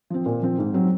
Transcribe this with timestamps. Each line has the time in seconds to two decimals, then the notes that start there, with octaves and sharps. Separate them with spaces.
0.10 F3 C4
0.26 A#2
0.42 F3 C4
0.58 G#2
0.74 F#3 C4